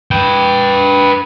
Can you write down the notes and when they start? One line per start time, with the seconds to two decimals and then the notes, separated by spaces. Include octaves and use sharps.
0.11 B4 G5